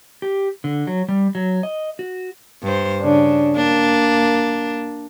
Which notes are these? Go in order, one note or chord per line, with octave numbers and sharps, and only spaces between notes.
G4
D3
F#3
G3
F#3
D#5
F#4
G2 C5
C#3 D4
A#3 D4